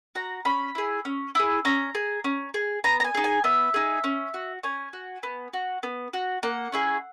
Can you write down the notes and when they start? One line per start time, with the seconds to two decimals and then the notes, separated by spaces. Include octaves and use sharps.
0.15 F#4 A#5
0.45 C#4 B5
0.75 E4 G#4
1.05 C#4
1.35 E4 G#4
1.65 C#4 A#5
1.95 G#4
2.24 C#4
2.54 G#4
2.84 B3 A#5
3.00 A#5
3.04 G#5
3.15 D#4 G#4
3.24 G#5
3.44 B3 E5
3.74 D#4 G#4
4.04 C#4
4.34 F#4
4.63 C#4 G#5
4.93 F#4
5.23 B3
5.53 F#4
5.83 B3
6.13 F#4
6.43 A#3 F#5
6.72 C#4 E4 G#4